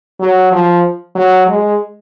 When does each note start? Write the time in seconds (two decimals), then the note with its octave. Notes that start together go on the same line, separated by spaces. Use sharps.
0.20 F#3
0.52 F3
1.15 F#3
1.48 G#3